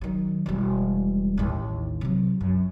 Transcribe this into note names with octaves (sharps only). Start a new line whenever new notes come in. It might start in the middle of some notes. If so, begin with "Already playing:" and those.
D#3 F#3
E1 G3
A1 D#2
C3 F#3
F#2